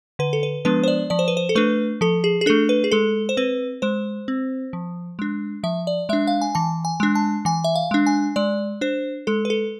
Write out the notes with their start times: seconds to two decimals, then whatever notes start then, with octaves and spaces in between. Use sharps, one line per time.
0.19 D3 B4
0.33 A4
0.43 B4
0.65 F3 G#3 B3 D4 B4
0.83 C5
0.88 D5
1.10 F3 D5
1.19 C5
1.28 B4
1.37 C5
1.49 A4
1.55 A3 D4 B4
2.01 F3 A4
2.24 G#4
2.41 G#4
2.46 A3 D4 A4
2.69 B4
2.84 G#4
2.92 G#3 A4
3.29 C5
3.37 C4 B4
3.82 G#3 C5
4.28 C4
4.73 F3
5.19 G#3 D4
5.63 F3 E5
5.87 D5
6.09 G#3 D4 E5
6.27 F5
6.41 G#5
6.55 E3 A5
6.85 G#5
7.00 G#3 D4
7.15 A5
7.45 E3 G#5
7.64 E5
7.76 F5
7.91 G#3 D4
8.06 G#5
8.36 G#3 D5
8.81 D4 C5
9.27 G#3 A4
9.45 B4
9.50 A4